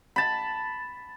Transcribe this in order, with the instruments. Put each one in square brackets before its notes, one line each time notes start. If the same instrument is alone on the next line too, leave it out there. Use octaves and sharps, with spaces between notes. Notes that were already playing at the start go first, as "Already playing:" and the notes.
[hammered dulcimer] A5 B5